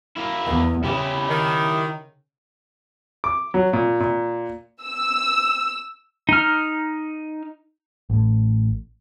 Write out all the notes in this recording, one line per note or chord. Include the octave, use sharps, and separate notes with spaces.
A#3 E4
E2
C#3 E4 G4
D#3
D6
F#3
A#2
A#2
E6
D#4 F6
A1 A2